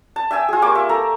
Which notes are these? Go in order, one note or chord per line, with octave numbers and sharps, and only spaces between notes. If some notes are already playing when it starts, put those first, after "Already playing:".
A5
E5 G5 G#5 E6
F4 G#4
A#3 G4 C#6 D6
E5
A4 A#5